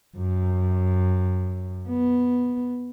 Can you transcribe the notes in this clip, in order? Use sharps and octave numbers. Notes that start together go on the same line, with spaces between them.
F#2
B3